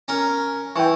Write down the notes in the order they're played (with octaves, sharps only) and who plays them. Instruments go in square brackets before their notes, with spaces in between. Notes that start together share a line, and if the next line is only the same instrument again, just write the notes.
[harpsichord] C#4 A#4
[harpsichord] E3 [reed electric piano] G5 G#5 C#6